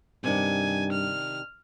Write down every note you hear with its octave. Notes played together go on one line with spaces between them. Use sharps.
G2 C3 D#3 D4 G#5
F6